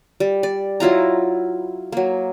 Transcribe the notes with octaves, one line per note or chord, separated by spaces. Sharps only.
G3
D5
F#3 E4 F4 A#5
F#3 A#3